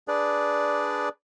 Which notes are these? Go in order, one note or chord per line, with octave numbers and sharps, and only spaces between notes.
D4 G#4 B4 D5